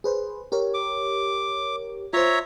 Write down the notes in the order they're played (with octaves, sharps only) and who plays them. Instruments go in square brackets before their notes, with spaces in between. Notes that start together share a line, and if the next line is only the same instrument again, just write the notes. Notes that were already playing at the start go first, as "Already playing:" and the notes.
[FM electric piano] G#4 B4 C5
G4 A#4 C#5
[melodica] D6
[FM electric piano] F4 C5 [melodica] C#5 E5 A#5